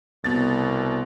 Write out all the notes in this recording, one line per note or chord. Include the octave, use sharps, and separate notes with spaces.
C2 B2 A6